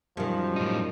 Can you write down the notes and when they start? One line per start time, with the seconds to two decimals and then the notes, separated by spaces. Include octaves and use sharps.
0.17 F#2 D#3 F3 G3
0.56 A2 D#4